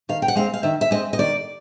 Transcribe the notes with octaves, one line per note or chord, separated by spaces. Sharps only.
D#3 F5
G5
F#5
G#3 C4 F5
F5
D#3 E5
E5
G#3 C4 D#5
D#5
D#3 D5